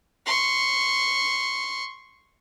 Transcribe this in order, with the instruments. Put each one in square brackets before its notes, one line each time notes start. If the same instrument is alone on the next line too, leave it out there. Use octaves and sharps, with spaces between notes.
[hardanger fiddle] C6 C#6